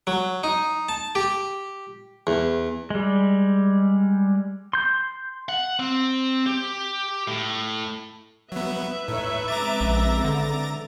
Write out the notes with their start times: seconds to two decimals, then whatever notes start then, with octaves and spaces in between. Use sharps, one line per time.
0.07 F#3
0.44 D#4
0.89 A5
1.15 G4
2.27 E2
2.90 G3 G#3
4.73 C6 G6
5.49 F#5
5.80 C4
6.46 G4
7.28 A2
8.52 F#3 B3 B4 E5
9.08 A2 D#4 E4 C#5
9.48 C#3 G#3 C4 A#5 D6 A6
9.81 A#1
10.24 D3